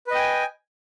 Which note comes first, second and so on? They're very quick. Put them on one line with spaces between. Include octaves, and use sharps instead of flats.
B4 D#5 G5 G#5